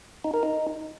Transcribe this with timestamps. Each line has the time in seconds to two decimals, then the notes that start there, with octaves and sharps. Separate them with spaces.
0.24 D#4
0.34 A#4
0.43 D#4